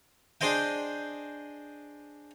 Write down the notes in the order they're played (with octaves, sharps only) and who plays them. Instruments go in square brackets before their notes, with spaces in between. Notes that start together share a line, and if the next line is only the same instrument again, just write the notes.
[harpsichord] D4 G#4 C5 D#5 G5